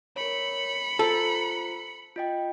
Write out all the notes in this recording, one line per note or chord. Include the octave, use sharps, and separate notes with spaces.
A#4 C#5 B5 C#7
F4 A4 C5 A#5
F4 D#5 G5